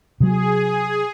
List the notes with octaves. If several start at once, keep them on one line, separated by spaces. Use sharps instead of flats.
C3 F#3 G#4